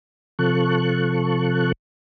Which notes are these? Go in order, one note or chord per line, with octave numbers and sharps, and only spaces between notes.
C3 F3 A4 C#6 F#6